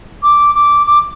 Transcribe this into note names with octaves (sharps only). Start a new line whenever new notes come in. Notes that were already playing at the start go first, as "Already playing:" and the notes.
D6
D6
D6